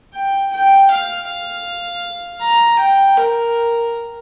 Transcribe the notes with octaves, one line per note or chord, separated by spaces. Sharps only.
G5
G5
F5
F5
A#5
G5
A#4